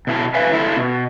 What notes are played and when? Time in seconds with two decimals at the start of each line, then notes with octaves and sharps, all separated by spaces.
0.07 B2 E4 A5
0.34 B4 E5 F5 G#5
0.52 E4 F4 A4 E5 F#5
0.77 B2